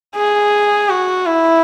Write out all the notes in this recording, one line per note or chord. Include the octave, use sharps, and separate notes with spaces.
G#4
F#4
E4